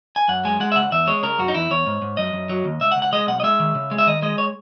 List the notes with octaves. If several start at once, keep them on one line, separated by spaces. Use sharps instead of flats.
G#5
F#2 F#5
G#3 G#5
G#3 F#5
E5
C#2 F#5
E2 E5
G#3 C#5
C#3 A#4
F#2 F#4
D#4
E2 E4
E2 C#5
G#2
G#2
F#2 D#5
F#2
F#3
D#2
C#2 E5
F#5
C#2
F#5
G#3 D#5
B1 F#5
D#5
G#3 E5
D#3
C#3
G#3
E5
D#3 D#5
G#3 D#5
C#5